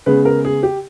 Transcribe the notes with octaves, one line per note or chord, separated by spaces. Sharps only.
C#3 G#3 B3 B4
A#4
G#4
G4